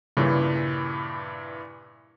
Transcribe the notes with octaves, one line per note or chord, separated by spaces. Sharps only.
G2 A#2 C#3 E3